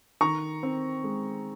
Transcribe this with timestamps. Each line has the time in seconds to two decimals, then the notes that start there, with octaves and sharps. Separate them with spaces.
0.21 D#3 A#5 C#6
0.63 C4
1.04 G#3